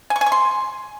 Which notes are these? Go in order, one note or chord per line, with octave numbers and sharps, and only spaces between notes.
G#5
C#6
G#5
C#6
C6